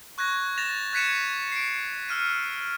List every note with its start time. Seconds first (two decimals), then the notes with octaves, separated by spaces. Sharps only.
0.18 C#6 F#6 G#6 A#6
0.58 A6 A#6 E7 F7
0.93 F#6 G#6 B6 C#7 D#7 E7
1.52 C7 D7
2.09 E6 F6 D#7